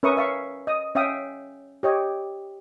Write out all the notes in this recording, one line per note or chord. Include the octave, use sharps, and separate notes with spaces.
C#4 A#4 B4 E5 C#6 D#6
E5 F5 C#6
D#5 D#6
C#4 E5 F5 G5 D#6
G4 C#5 D#5